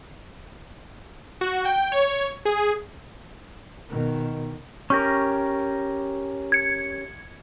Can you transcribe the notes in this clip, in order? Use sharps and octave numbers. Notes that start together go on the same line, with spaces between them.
F#4
G5
C#5
G#4
B2 D#3
C#4 G4 A#4 C#6
G#6 C#7